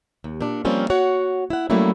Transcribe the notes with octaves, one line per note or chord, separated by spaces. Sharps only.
D#2
A#2 D4
F3 G3 A#3 C4 C#4 F4
F#4 C#5 F#5
E4 F#5
F#3 G3 A3 A#3 C#4 E4